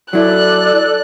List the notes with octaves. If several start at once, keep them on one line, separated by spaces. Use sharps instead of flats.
F#3 E4 A4 D5 F#6